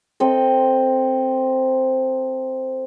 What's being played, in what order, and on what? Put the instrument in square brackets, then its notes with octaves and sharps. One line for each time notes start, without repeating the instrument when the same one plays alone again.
[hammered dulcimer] C4 A4 D#5